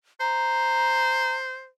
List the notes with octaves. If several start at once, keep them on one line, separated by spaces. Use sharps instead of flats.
C5 A#5